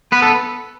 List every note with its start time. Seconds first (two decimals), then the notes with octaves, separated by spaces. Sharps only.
0.12 B3 B4
0.22 A4